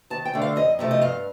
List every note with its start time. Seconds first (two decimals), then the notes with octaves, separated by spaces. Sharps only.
0.10 D#2 A5
0.25 G5
0.34 D3 A3
0.42 F5
0.56 F2 D#5
0.79 C3 F3 A3
0.91 D#5
1.01 G2 F5